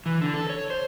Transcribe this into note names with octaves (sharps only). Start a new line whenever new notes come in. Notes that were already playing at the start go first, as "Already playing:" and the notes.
E3
D3
A4
C#5
C5